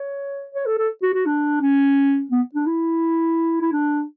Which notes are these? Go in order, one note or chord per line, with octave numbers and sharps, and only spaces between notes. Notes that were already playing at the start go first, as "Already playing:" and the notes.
Already playing: C#5
C#5
A4
A4
F#4
F#4
D4
C#4
B3
D4
E4
E4
D4